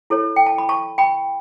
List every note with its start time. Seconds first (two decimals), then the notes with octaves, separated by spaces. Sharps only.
0.10 E4 A4 C#5
0.36 G5
0.46 A5
0.58 B5
0.69 A5 C#6
0.98 G5 B5